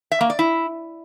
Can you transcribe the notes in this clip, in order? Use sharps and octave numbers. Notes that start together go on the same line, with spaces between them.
E5
A#3
D5
E4